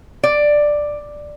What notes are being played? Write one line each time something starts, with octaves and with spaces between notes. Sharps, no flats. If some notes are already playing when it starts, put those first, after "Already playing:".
D5